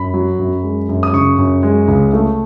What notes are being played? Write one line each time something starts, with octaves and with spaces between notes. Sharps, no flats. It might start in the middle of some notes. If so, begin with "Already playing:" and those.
Already playing: F#2 B5
F#3
F#2
G#3
F#2
D#6
C#3 C#6
F#2
G#3
C#2
A3